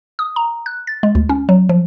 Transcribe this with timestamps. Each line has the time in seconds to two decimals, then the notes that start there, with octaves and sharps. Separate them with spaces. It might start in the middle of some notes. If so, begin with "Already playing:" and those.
0.19 D#6
0.36 A#5
0.66 F#6
0.87 A6
1.03 G#3
1.15 D2
1.29 C#4
1.49 F#3
1.69 F3